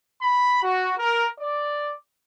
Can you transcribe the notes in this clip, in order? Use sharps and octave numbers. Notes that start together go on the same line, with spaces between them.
B5
F#4
A#4
D5